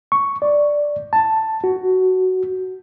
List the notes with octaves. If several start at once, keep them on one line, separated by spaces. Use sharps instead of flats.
C#6
D5
A5
F#4